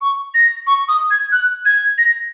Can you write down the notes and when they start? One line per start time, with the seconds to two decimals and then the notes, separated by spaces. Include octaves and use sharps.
0.01 C#6
0.34 A#6
0.67 C#6
0.88 D#6
1.11 G#6
1.32 F#6
1.66 G#6
1.98 A#6